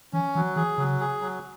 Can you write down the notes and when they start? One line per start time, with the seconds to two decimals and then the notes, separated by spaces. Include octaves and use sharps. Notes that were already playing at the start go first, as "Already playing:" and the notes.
0.13 E3 C#4
0.35 E3 F#3
0.56 E3 G#4
0.78 C#3 F#3
1.00 G#4
1.22 F#3